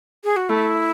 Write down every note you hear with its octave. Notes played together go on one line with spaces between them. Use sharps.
G#4
F#4
A3 E4